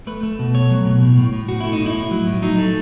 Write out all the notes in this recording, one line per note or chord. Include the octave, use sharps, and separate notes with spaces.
A3 B4
A3
B2
A3 C#5
F#3
B2
A2
A2
A2
A2 F#4
A3 E4
D#4
A2
E4
A2
F#3
A2
F#3 D#4
A3